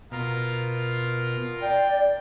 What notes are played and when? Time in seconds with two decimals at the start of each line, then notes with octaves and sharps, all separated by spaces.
0.12 B2 F4 A#4
1.62 D5 G5